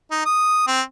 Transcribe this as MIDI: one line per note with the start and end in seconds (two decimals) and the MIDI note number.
0.11 0.21 63
0.25 0.66 87
0.67 0.81 60